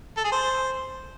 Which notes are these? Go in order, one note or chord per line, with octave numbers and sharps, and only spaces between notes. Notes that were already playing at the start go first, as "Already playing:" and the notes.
A4
G#4
C5